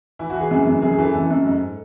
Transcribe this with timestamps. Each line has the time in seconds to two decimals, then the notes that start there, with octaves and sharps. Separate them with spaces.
0.19 E3 E4
0.30 F#4
0.35 E3
0.40 G#4
0.51 F#2
0.67 F#2
0.82 F#2 G#4
0.93 G#4
0.99 E3 A4
1.15 F#2 A4
1.31 F#2
1.46 G#2